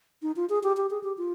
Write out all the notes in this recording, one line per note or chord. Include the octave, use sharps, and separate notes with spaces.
D#4
F4
G#4
G4
G4
G#4
G4
F4